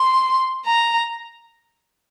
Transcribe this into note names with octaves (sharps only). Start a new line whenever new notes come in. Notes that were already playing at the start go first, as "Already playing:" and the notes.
Already playing: C6
A#5